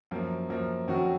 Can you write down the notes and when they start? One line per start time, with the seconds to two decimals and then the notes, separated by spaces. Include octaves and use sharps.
0.11 F#2 F3 A#3
0.49 F#2 F3 A#3
0.88 F2 D#3 F#3 C#4 F#4